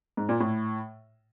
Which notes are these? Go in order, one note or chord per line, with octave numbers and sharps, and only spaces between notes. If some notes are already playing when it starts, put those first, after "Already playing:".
G#2
A#2
A2